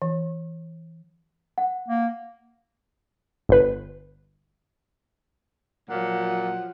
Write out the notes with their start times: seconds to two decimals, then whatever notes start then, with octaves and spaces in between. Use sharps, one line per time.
0.02 E3
1.58 F#5
1.88 A#3
3.49 G1 B4
5.89 A#2 F3 F#3 F#5